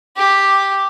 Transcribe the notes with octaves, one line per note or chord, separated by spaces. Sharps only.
G4